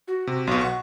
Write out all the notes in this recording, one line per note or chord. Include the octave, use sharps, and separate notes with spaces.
F#4
C3
B1 B2
F#5 C#6